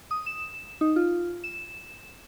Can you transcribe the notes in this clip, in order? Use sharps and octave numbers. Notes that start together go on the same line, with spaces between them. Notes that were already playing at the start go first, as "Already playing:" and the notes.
D#6
E7
D#4
F4
E7